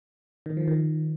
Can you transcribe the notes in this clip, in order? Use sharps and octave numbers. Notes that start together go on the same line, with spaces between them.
D#3
F3
D#3